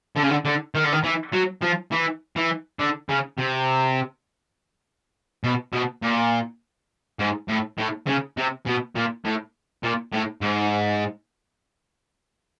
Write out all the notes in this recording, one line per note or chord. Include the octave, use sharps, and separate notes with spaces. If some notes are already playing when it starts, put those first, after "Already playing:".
D3
C#3
D3
D3
D#3
D3
D#3
E3
F#3
F3
E3
E3
D3
C#3
C3
B2
B2
A#2
G#2
A2
A2
C#3
C3
B2
A#2
A2
A#2
A2
G#2